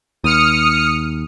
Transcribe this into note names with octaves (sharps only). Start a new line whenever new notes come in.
D#2 D#6 F6 C#7